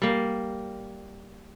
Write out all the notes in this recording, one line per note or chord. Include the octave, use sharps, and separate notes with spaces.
G3 A#3